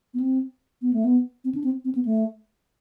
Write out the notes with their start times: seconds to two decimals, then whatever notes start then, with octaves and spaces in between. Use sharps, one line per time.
0.14 B3
0.20 C4
0.82 B3
0.93 A3
1.04 B3
1.44 C4
1.55 D4
1.64 C4
1.85 C4
1.95 B3
2.05 A3